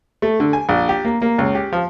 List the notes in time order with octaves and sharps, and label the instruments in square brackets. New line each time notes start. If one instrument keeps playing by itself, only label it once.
[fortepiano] A3
D3
G#5
A#1
G4
A#3
A#3
C#2
G4
F3